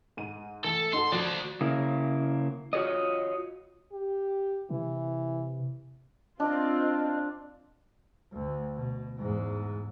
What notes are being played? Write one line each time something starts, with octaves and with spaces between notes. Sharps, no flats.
G#2 D#7
E3 A3 A4
D#4 F#4 A4 C6
F3 F#4 D5 C7
C#3 A#3 E4
F4 F#4 A4 C#5 D#5
G4
C3 E3
C4 D4 F4 D#5
D2
B2
E2 G#2